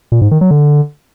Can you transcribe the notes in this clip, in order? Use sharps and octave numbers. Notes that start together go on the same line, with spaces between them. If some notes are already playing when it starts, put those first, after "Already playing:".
A#2
G#2
D#3
F#3
D3